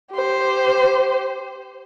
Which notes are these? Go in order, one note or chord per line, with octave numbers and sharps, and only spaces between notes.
G4 C5